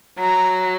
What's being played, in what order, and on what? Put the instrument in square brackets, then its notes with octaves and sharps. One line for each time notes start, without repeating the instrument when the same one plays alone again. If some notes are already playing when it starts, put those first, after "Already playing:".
[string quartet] F#3 [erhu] A#5